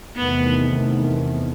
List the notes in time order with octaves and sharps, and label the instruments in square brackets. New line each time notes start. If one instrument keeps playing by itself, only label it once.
[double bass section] E2 C3 D#3 A3 [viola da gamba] B3